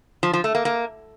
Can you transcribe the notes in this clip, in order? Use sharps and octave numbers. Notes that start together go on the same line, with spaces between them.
F3
F3
A3
A#3
A#3